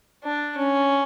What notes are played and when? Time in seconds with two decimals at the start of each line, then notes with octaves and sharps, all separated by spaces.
0.23 D4
0.57 C#4